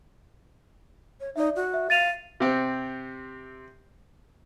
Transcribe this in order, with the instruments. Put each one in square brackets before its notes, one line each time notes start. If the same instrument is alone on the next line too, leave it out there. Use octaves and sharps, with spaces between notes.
[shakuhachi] C#5
[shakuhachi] D#4 [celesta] D5 E5
[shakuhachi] F#4
[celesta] E5
[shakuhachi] F5 [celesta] A6 D#7 F7
[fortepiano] C3 C4